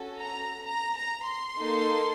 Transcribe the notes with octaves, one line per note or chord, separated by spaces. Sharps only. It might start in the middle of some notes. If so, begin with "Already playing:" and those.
Already playing: C#4 F#4 A4
A#5
A#5
A#5
C6
A#3 D#4 A4